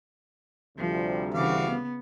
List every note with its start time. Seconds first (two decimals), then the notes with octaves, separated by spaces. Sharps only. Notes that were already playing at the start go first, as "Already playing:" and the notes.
0.78 D2 C3 F3 G3
1.34 C#3 E3 F#4 F5 D6
1.69 B3